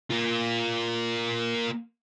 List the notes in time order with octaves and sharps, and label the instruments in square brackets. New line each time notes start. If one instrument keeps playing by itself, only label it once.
[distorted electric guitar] A#3 F4